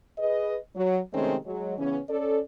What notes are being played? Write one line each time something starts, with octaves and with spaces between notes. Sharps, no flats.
G#4 B4 D#5
F#3
C3 D#3 G#3 A3 C4 C#4
F#3 G#3
C#3 E3 B3 C#4
C#4 A4 D5